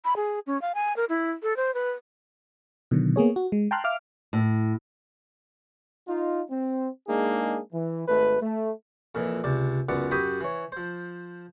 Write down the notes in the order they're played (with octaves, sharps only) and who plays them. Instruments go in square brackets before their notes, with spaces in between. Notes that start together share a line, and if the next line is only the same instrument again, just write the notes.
[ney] B5
G#4
C#4
F5
G#5
A#4
E4
A4
C5
B4
[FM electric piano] B2 D3 D#3 F#3
A#3 B3 G#4 C#5
F#4
G#3
G5 A5 A#5 C6 F6 F#6
E5 F5 D6 F6
[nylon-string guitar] A2
[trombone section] D#4 F4
C4
G#3 A#3 D4 D#4 G#4
E3
G#1 A3 B4
A3
[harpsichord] F2 A#2 E3
C#2 C3 D5
C#2 F#2 B3 D5 F#5
F#2 F#4 G4 G5 B5 D#6
E3 C#5
F3 C5